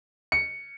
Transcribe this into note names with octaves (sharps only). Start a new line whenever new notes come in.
C#7